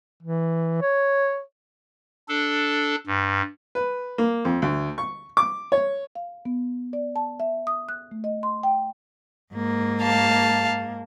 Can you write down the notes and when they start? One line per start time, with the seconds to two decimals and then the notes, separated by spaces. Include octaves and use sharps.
0.23 E3
0.82 C#5
2.29 D4 A4
3.07 G2
3.75 B4
4.18 A#3
4.45 F2
4.62 D2
4.98 C#6
5.37 D6
5.72 C#5
6.15 F5
6.45 B3
6.93 D5
7.16 A5
7.40 E5
7.67 D#6
7.89 F#6
8.11 A3
8.24 D#5
8.43 C6
8.63 G5
9.54 G#2 A#3
10.02 F5 A5